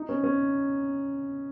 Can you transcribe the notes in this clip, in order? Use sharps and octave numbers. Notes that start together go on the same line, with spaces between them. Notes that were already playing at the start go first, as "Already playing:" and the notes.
Already playing: D#4
C#4
C#4